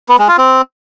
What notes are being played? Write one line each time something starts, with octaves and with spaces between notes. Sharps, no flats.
B3
G#3
F4
C4